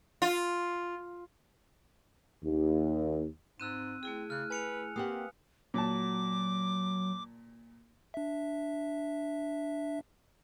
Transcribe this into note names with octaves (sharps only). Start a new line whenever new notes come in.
F4
D#2
G#2 C4 E6 F#6 D#7
A3 C4 E4 G#4
C#3 F6 F#6
B4 G#5 C#7 F7
A#3 C4 G4 B4 F5 F#5 D#6
A#2 F#3 A5 D6
D4 E5